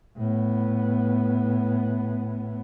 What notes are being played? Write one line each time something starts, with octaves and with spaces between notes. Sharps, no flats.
A2 B3